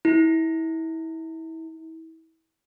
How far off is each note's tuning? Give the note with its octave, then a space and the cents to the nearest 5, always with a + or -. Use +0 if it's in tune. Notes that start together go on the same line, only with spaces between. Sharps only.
E4 -30